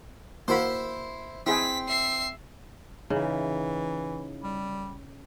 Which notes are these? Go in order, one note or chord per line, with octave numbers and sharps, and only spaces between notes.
A#3 E4 F#4 C5 B5
C4 E4 G#4 G5 B6
E5 C7
C#3 E3 D#4 E4
G3